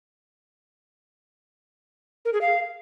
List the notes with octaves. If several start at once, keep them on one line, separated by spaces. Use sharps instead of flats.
A#4
G#4
F5